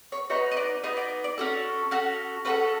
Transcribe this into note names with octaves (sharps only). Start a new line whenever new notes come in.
C#5
B3 D#4 F#4 C#5
D#5
D5
B3 D#4 F#4 D#5
D5
D5
C#4 F#4 A4
C#4 F#4 A4
C#4 F#4 A4 B4